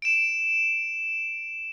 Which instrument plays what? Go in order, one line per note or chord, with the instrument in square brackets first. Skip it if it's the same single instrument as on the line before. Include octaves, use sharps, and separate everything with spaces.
[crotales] D7 E7